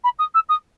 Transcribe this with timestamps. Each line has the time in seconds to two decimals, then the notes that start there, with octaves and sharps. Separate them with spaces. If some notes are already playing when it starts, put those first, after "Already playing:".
0.04 B5
0.19 D#6
0.34 E6
0.49 D#6